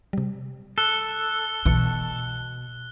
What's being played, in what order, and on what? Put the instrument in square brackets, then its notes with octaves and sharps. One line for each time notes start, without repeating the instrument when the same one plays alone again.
[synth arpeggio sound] C3 G3
[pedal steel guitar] A4 [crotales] F#6 G7
[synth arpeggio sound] B1 E3 C#7 [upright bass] B2